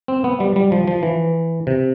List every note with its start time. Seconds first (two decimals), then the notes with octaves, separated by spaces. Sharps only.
0.08 C4
0.24 B3
0.40 G3
0.56 G3
0.72 F3
0.88 F3
1.03 E3
1.67 C3